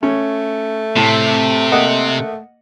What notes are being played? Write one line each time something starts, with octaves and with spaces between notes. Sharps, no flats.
A3 C#4
A2 C3
A#3 D#5 F#5